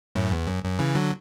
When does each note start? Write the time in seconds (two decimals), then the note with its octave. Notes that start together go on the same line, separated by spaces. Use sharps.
0.15 F#2 A2
0.32 E2
0.47 F#2
0.64 F#2
0.79 C#3 E3
0.95 D3 F#3